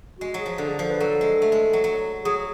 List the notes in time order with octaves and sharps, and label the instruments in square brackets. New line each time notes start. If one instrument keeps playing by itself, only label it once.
[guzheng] G#3 [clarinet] F#4
[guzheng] F#3 [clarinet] G#4
[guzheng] F3
[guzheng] D3 [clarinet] A4
[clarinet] G#4
[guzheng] F3 [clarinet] A4
[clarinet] B4
[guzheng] F#3 [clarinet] A4
[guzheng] G#3
A3
G#3
F#3
F#3
[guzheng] F#3 [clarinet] G#4